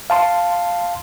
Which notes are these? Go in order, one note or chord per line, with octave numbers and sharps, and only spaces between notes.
F5 A5 C6